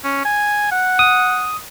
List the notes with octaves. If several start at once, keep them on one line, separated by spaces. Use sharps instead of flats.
C#4
G#5
F#5
D#6